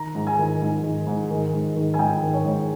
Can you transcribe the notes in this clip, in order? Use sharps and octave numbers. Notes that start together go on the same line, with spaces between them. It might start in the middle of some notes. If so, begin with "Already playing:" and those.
Already playing: D#3 A#5
G#2
G#5
D#3
G#2
D#3
G#2
D#3
G#2
D#3
G#5
G#2 G5
D#3
C#5
G#2